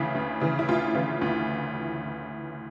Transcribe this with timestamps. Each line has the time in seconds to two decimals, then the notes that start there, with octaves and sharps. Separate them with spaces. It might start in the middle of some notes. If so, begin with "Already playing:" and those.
Already playing: D2 C#3 E3 E4
0.15 D2
0.41 C#3 E3
0.59 E4
0.68 D2 F4
0.95 C#3 E3
1.21 D2